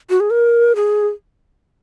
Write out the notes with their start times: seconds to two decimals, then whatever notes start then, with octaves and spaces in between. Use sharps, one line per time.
0.10 F#4
0.20 G#4
0.30 A#4
0.76 G#4